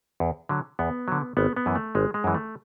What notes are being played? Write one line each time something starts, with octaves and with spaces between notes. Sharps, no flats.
E2
D3 F#3
E2 B3
D3 F#3
G#1 B3
B3
F#2 E3
A3
G#1 G#3
G#3
F#2 E3
A3